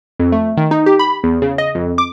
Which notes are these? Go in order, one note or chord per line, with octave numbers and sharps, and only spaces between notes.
F2
A3
D#3
D#4
G4
B5
E2
C#3
D#5
F2
D6